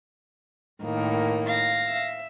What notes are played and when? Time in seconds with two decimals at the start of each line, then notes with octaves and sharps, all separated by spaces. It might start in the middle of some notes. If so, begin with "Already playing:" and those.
0.81 A2 D#3 A#3
1.46 F5 A#6
1.87 E5